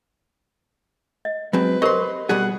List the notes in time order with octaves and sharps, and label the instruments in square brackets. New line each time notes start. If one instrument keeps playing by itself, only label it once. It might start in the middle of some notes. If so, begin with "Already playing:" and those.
[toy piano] D#5
[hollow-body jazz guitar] F#3 G#3 C4 [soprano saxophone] B4
[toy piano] G4 A#4 C5 [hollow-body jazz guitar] D#5 C6
[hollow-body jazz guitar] B2 G3 G#4 [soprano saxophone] F#5